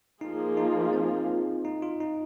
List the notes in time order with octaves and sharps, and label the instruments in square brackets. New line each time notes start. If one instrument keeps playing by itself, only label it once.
[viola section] F3 A#3 F4 G#4 [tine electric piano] D#4
[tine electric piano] D#4
C4
D#4
F4
D#4